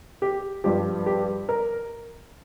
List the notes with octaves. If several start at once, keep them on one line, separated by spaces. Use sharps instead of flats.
G4
G2 F3 G4
G4
A#4